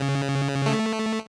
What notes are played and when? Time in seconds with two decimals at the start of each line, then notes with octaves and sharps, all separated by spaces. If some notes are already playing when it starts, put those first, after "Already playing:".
Already playing: C#3
0.66 A3